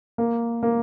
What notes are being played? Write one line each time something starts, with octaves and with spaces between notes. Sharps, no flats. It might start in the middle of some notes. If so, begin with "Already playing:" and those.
A#3
A#3